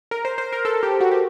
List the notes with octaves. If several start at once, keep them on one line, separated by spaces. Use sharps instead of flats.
A#4
C5
C5
A#4
A4
G4
F#4
G4